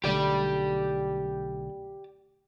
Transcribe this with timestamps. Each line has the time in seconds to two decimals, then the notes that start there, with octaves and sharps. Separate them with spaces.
0.04 B1 D3 A3 G4 D5